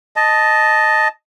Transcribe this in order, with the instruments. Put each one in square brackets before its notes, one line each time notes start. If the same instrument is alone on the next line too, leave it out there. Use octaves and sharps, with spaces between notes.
[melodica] D#5 A5